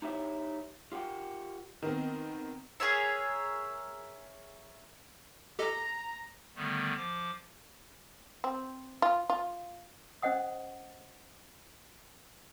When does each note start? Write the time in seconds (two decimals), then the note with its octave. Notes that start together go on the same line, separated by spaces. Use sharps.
0.02 D#4 E4 G4 C5 C#5 E5
0.92 F4 G4 A#4 F#5 G5
1.82 D#3 B3 C4
2.80 G#4 A#4 C#5 E5
5.59 G4 A4 D#5 A#5
6.56 D3 D#3 G3 A3 B3
6.97 F3 D6
8.44 C4
9.02 F4
9.30 F4
10.22 C#4 C5 D#5 F#5 D#6